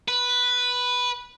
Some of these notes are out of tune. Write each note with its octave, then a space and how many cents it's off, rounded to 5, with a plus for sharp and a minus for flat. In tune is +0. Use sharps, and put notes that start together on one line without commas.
B4 -5